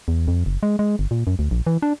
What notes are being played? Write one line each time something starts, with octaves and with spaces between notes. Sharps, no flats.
E2
F2
F#1
G#3
G#3
G1
A#2
F#2
D2
A#1
E3
D4